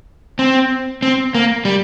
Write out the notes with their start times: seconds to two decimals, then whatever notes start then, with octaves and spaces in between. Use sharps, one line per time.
0.39 C4
1.03 C4
1.35 A#3
1.65 G3